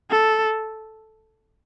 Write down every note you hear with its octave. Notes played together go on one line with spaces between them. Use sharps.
A4